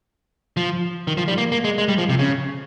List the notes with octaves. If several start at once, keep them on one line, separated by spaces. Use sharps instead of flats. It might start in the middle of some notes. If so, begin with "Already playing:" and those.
F3
D#3
F3
G3
A#3
A#3
G#3
G#3
G3
F3
C3
C#3